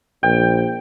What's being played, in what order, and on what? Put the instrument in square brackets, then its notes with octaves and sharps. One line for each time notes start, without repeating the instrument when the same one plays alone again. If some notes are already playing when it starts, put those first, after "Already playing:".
[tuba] A#1 [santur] G5